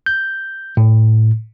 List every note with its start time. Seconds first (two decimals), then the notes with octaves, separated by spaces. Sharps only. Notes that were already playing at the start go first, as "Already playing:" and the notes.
0.06 G6
0.77 A2